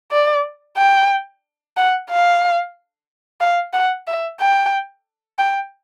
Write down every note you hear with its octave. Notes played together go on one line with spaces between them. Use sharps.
D5
G5
F#5
F5
F5
F#5
E5
G5
G5